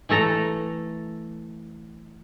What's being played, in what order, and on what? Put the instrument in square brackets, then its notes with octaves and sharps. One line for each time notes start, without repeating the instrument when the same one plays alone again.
[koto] E3 A3 A4 A#5